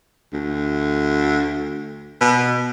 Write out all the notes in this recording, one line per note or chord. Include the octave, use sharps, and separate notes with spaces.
D2
B2